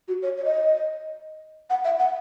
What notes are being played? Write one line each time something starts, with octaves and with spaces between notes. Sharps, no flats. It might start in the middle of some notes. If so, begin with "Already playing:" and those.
F#4
C#5
C#5
D#5
F#5
E5
F#5